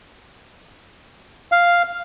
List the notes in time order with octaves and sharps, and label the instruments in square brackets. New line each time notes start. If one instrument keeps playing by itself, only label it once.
[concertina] F5